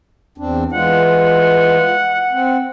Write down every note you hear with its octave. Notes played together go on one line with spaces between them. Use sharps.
E2 C4 D4
E3 G#3 F4 F#5
C4